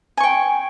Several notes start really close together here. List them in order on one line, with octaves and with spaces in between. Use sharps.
G#5 C#6 G5